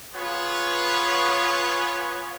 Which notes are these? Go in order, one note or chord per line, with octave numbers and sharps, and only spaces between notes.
B3 F4 G#4 B4 C#5